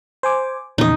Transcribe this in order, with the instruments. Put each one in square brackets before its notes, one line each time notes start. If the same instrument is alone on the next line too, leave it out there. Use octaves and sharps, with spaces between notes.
[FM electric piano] C5 G#5 D6
[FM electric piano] A#1 E2 C#3 [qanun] D#4 D#5